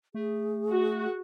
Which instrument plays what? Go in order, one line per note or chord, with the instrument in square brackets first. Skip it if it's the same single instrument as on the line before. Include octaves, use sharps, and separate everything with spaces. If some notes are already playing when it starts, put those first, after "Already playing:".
[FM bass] A3 [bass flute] G#4
[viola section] F#4